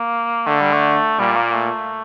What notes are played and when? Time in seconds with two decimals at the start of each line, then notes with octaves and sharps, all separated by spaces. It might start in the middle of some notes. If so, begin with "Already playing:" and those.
Already playing: A#3
0.46 D3 A3
0.60 G3
0.73 A3
1.19 A#2 G3
1.36 A#3
1.54 A3